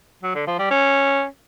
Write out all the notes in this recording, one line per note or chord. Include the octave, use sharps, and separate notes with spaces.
F#3
D3
F3
G3
C#4